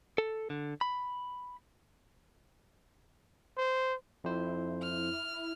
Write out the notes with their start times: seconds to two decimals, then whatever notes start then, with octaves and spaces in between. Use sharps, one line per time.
0.18 A4
0.50 D3
0.81 B5
3.57 C5
4.24 F2 E4 C5
4.82 F6